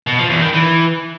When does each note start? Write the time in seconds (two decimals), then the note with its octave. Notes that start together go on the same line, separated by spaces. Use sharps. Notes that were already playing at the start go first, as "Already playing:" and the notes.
0.07 B2
0.18 F3
0.30 E2
0.41 D#3
0.53 E3